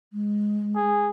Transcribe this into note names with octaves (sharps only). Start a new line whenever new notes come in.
G#3
G#4